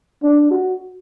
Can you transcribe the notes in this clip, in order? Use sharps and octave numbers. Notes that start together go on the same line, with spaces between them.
D4
F#4